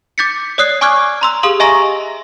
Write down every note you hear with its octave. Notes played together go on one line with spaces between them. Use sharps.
D6 G6 A6 B6 C#7
C#5 D5 D#6 F#6 C7
G#5 C#6 D6 F6 F#6 G#6
A#5 C6 E6
G4 G#4 F5 C6 D#6 F#7
D#5 E5 G#5 A#5 C#6 A#6